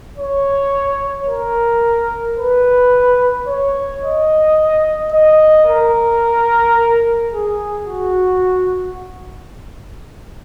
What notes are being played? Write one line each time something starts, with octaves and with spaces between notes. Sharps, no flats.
C#5
A#4
B4
C#5
D#5
D#5
A#4
G#4
F#4